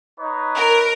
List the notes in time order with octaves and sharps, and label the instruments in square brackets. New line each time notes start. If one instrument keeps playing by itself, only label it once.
[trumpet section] D#4 B4 C#5
[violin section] A#4